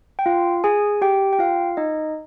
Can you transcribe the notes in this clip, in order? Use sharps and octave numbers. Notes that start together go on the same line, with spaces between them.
G5
F4 F5
G#4 G#5
G4 G5
G5
F4 F5
D#4 D#5